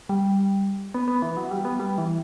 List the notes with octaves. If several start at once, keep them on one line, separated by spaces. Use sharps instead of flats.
G3
B3
B3
E3
F#3
G3
B3
G3
E3